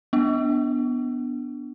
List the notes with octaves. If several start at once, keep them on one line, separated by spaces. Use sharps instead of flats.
B3 D4